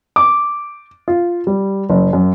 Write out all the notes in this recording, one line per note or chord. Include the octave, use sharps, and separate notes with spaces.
D6
F4
G3
F#1
F#2